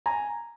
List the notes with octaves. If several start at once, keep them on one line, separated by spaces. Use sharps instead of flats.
G#5 A#5